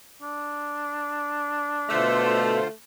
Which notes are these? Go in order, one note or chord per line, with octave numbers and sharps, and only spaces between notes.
D4
B2 D3 A3 F4 C5